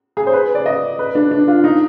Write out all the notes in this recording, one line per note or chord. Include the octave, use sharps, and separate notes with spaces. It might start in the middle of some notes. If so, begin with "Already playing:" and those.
G#4
C5
B4
D5
D#5
B4
D4
D4
F4
D#4